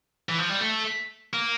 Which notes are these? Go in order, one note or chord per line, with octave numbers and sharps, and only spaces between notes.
E3
F3
G3
A3
A#3